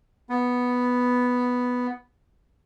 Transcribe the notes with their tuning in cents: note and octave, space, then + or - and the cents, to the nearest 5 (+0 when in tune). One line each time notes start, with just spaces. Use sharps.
B3 +0